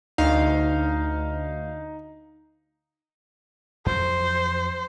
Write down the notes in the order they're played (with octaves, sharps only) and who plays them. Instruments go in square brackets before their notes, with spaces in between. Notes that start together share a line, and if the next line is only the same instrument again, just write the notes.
[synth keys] D2 F5 [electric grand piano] D#4
[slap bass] F2 F#3 [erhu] C5